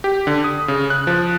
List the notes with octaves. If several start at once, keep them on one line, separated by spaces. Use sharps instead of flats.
G4
D3
D#6
C#3
F#6
F3